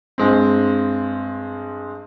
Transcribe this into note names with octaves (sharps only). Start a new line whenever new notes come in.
G2 G#3 C4